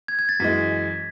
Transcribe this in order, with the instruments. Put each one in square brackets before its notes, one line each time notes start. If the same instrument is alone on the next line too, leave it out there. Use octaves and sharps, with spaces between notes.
[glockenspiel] G#6
G#6
A6
[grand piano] F#2 E3 G#3 [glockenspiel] B6